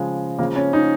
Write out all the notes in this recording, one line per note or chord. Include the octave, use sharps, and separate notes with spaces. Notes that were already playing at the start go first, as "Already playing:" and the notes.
Already playing: C#3 F3 G#3
C#3 F3 G#3 A#3
C#4
D#4